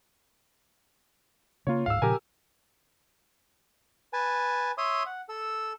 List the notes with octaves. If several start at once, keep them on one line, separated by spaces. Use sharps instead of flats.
C#3 A#3 F4 C#5
D1 G#2 F5 E6
A#2 C#3 F3 G4 A#4 G#5
B4 G#5 A5
C#5 E5 C6 D#6
F#5
A4 E6